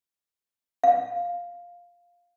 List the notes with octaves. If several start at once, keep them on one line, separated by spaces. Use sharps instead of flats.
F5